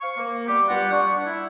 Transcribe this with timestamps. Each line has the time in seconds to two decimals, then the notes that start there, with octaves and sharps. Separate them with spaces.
0.02 C5 F5 C#6
0.17 A#3
0.48 G3 B3 G4 D6
0.69 G2 G3 F4 G4 F#5
0.93 D4 F#5 C#6
1.26 E4